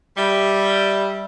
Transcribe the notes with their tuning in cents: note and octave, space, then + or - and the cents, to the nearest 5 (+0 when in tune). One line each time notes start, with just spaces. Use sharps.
G3 +0 E5 +0